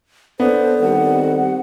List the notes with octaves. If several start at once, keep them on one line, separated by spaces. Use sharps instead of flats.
B3 D4 A4 C5
D#3 G3 C4 F#5